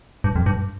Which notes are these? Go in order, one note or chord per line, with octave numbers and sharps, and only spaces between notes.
G2
F2
G2